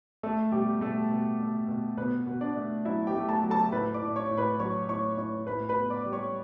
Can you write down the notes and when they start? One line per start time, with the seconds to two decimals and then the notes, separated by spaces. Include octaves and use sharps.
0.23 A3 A4
0.52 B2 G3 G4
0.81 B2 A3 A4
1.11 B2
1.40 A3
1.68 B2
1.98 B2 B3 B4
2.27 B2
2.41 D4 D5
2.57 A3
2.85 F#3 E4 E5
3.07 G4 G5
3.15 A3
3.29 A4 A5
3.43 F#3
3.50 A4 A5
3.72 A2 B4 B5
3.94 D5 D6
4.02 A2
4.16 C#5 C#6
4.31 A2
4.37 B4 B5
4.59 F#3 C#5 C#6
4.89 A2 C#5 C#6
5.17 A2 C#5 C#6
5.47 A2 B4 B5
5.69 B4 B5
5.77 B3
5.90 D5 D6
6.06 G3
6.13 C#5 C#6